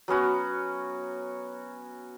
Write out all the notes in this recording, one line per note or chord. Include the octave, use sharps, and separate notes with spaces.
F#3 B3 C#4 F#4